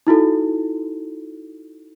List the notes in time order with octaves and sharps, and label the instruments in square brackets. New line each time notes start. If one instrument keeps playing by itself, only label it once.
[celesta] D#4 E4 F#4 A4